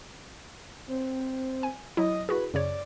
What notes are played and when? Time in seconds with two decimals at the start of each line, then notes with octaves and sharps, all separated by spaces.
0.87 C4
1.63 G#5
1.97 F#3 E4 D#5
2.29 E4 F#4 G#4 B4
2.54 F#2 C#3 C#5 D5